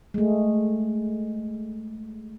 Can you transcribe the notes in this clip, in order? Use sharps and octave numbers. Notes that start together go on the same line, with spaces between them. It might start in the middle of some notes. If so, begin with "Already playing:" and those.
G#3 A3